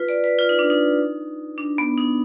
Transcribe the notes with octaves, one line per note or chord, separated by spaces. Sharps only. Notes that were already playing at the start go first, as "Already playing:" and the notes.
Already playing: F4 B4
D5
B4
F4
D#4
D4
D#4
D4
B3
D#4